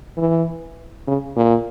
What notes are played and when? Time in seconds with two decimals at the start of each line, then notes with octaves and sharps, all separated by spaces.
0.18 E3
1.08 C#3
1.37 A#2